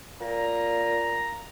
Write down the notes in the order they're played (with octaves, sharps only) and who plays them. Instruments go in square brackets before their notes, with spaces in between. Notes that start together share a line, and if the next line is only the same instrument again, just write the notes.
[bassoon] A#2 [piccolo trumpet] A#5